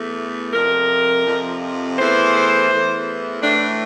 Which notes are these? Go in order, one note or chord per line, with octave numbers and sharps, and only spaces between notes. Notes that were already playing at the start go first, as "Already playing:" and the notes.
Already playing: E2 E3 A3
F2 C3 F3 A#4
F2 C3 F3
E2 E3 A3 C5
E2 E3 A3
A2 E3 A3 D4